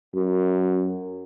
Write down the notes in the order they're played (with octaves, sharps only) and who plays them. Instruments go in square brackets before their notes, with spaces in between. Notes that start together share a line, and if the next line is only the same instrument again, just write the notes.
[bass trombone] F#2